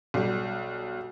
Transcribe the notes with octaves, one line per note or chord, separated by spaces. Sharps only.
B1 G3